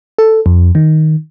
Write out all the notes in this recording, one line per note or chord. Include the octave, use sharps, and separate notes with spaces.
A4
F2
D#3